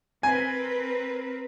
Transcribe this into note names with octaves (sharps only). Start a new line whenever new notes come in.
C4 A#4 B4 G#5